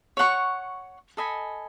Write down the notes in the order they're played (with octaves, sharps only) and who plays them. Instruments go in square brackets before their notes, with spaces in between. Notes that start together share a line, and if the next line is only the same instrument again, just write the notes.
[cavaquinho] C#5 F#5 C#6
A4 D#5 G#5 B5